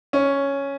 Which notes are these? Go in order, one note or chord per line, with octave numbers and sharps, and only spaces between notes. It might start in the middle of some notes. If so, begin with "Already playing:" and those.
C#4